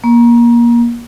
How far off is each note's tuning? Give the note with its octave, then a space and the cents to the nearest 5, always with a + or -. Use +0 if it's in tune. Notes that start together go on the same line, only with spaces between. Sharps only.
A#3 +25